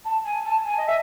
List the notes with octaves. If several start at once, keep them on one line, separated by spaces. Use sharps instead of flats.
A5
G#5
A5
G#5
D#5
E5